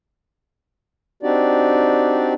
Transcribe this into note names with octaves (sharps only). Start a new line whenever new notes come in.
C4 D4 D#4 F#4 G4 D5